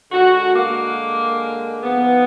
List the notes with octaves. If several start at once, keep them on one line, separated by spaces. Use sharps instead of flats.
D3 G#3 F#4
A#3
G#2 F3 A#3 B3